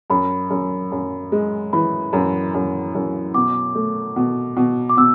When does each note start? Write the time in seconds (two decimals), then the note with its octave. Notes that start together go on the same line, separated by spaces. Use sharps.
0.10 F#2 B5
0.50 F#2
0.92 F#2
1.32 G#3
1.73 E3 B5
2.13 F#2
2.54 F#2
2.95 F#2
3.34 B2 D6
3.75 A3
4.16 B2
4.57 B2
4.89 D6
4.97 B2 E6